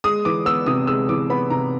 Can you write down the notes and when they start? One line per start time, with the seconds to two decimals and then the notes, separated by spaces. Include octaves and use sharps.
0.04 G#3 D#6
0.25 E3 D6
0.46 B3 E6
0.66 C3 D#6
0.87 G#3 E6
1.09 E3 D6
1.30 B3 B5
1.50 C3 A#5